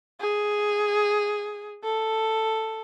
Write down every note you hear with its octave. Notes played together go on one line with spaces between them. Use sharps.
G#4
A4